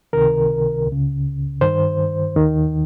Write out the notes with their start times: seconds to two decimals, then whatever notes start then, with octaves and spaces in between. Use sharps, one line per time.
0.13 C#2 C3 D#3 A#4
0.87 C#2 C#3
1.61 G2 D#3 C5
2.36 D#2 D#3